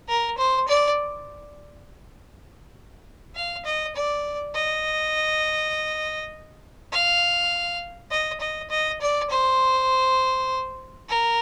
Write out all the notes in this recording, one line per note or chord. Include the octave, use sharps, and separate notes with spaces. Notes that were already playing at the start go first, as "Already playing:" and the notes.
A#4
C5
D5
F5
D#5
D5
D#5
F5
D#5
D#5
D#5
D5
C5
A#4